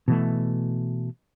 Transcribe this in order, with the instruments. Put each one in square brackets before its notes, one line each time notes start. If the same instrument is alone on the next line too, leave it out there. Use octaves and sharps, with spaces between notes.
[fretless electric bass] B2 E3 A3